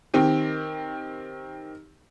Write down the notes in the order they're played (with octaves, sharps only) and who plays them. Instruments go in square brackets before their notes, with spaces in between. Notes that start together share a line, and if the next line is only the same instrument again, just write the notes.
[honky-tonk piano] D#3 C4 G4